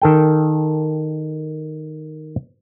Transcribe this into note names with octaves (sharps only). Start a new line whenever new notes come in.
D#3 A4 G5